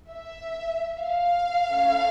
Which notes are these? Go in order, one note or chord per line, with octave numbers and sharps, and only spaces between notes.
E5
F5
A3 C#4 E4 A4